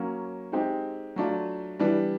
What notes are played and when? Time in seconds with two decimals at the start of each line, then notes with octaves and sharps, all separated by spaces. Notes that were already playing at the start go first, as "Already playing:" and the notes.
Already playing: F#3 A#3 C#4
0.52 G#3 C4 D#4 G4
1.16 F#3 A3 D4 F4
1.79 E3 G3 B3 D4